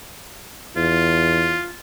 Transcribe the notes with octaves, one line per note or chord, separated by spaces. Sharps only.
E2 F4